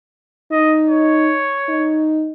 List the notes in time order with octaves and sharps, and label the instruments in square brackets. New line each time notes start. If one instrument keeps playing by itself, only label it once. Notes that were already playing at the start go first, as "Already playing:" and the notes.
[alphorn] D#4 [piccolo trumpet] D#5
[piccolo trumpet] C#5
[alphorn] D#4